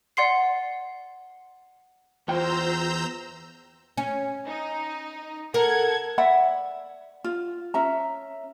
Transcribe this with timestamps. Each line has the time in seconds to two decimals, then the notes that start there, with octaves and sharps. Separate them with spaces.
0.17 D5 F#5 C6 C7
2.28 E2 F4 C5 G5 A#5 E6 G6
3.97 C#4
4.47 D#4
5.54 A4 A#4 F#5 G#6
6.18 D5 E5 F#5 B5
7.24 F4
7.74 C#4 E5 A#5